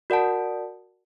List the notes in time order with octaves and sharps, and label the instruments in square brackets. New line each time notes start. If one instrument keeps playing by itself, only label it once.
[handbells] F#4 A#4 D5 F#5 A5